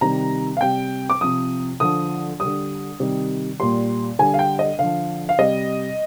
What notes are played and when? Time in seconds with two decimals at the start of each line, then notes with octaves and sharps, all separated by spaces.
0.01 C3 D#3 G3 A#5
0.57 F5
0.61 C3 G3 G5
1.10 D6
1.21 C3 F3 D#6
1.80 D3 F3 D#6
2.40 D3 G3 D#6
3.00 C3 D#3 G3
3.60 A#2 G3 C6
4.19 D3 G3 G#5
4.34 F5
4.39 G5
4.59 D#5
4.79 D3 F3 F5
5.29 F5
5.38 C3 G3 D#5